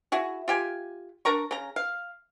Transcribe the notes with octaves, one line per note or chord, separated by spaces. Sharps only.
E4 F#4 G#4
F4 G4 G#5
D4 A#4 A#5 C#6
C#3 A#5
F5